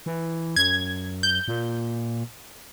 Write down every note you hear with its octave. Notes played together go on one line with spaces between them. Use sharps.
E3
F#2 G#6
G6
A#2